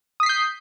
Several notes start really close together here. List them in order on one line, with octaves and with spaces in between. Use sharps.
D#6 B6 C7 G6